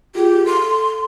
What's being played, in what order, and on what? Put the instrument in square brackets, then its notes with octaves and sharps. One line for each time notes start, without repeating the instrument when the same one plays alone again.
[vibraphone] F4 G#4 [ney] G4
[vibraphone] A4 [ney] C6